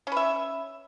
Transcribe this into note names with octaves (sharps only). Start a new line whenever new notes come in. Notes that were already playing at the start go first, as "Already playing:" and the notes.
C#4 B4 E5